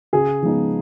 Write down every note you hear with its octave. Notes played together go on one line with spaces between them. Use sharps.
C#3 G#4
F3 G#3 B3 D#4